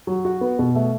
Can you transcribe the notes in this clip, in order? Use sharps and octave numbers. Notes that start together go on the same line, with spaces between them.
F#3
F#4
B3
B2
A3